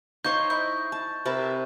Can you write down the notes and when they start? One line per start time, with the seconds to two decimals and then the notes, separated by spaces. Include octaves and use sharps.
0.25 D#4 F4 C5 C#5 C#6 G6
0.50 E4 D#5 G6
0.92 A5
1.26 C3 E4 A#4 B4 A5